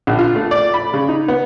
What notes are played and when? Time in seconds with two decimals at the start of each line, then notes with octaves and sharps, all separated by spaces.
0.07 A#1
0.19 F4
0.36 A3
0.51 D5
0.74 B5
0.94 C#3
1.09 D#4
1.28 B3